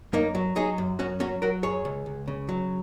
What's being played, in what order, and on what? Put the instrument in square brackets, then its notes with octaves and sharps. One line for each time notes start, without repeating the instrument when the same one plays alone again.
[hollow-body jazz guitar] F#2 A#3 D#4
F#3
F#3 D#4 G#4
F#2
F#2 C#4 F#4
F#3 C#4 F#4
F#3 F#4 A#4
F#2 G#4 C#5
C#2
C#2
C#3
F#3